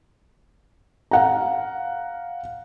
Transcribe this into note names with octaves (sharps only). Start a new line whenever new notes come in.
F5 F#5 A#5